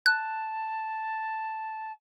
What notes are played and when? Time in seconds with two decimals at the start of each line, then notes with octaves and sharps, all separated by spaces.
0.06 A5 F#6